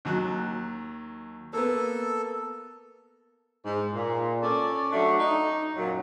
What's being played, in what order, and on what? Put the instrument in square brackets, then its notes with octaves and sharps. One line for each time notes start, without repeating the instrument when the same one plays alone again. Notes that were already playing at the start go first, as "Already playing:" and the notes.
[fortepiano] D#2 F#3 F#6
[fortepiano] A#3 B3 [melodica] A4
[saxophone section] G#2
A#2
C#4 A4 D5
F#3 A3 D4 F#4
D#4
F#2 A#2 F#3